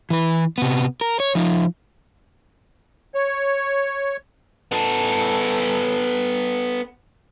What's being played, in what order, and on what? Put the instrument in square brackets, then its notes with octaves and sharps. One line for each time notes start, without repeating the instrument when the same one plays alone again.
[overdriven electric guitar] E3 B4
C3 B3
A#4
C#5
F3 D#4
[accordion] C#5
[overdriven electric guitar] B3 A4